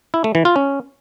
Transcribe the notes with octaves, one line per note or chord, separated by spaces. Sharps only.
E4
A3
E3
F4
C#4